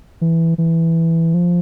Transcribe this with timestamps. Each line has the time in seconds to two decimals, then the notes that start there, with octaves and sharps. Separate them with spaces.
0.21 E3
0.58 E3
1.34 F3